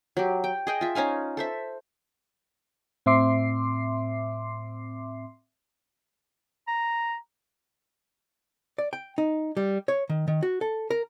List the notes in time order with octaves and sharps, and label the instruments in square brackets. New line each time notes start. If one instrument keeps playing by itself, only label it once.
[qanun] F#3 G4
G5
G#4 D#5 G5
F4 E5
C#4 D#4 F5 G#5
A4 C5 E5
[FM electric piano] A2 C4 E5 C6 D6 C7
[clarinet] A#5
[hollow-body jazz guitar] D5
G5
D#4
G3
C#5
D#3
D#3
F#4
A4
A#4